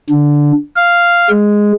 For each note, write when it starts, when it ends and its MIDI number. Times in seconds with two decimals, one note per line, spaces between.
0.10 0.52 50
0.76 1.29 77
1.30 1.72 56